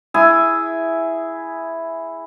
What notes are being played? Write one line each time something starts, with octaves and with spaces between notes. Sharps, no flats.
E4 G#4 G#5